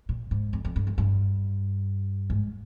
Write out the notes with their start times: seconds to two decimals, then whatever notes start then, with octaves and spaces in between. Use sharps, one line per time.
0.09 A#2
0.31 G#2
0.53 F2
0.65 F2
0.76 G2
0.87 F#2
0.98 G2
2.30 G#2